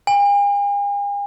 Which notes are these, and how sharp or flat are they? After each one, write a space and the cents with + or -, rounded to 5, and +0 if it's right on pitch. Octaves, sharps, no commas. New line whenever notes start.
G#5 -45